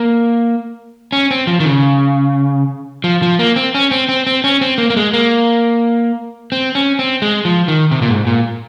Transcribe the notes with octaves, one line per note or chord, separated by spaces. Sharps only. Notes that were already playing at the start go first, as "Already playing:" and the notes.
Already playing: A#3
C#4
C4
F3
D#3
C#3
F3
F3
A#3
C4
C#4
C4
C4
C4
C#4
C4
A#3
A#3
G#3
A#3
C4
C#4
C4
G#3
F3
D#3
C3
A#2
G#2
A#2